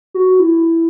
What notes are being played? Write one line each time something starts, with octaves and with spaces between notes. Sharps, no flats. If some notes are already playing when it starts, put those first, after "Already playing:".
F#4
E4